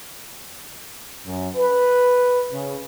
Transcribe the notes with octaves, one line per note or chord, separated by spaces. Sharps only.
F#2
B4
C#3